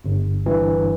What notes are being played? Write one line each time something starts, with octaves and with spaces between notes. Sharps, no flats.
G1
G2 E3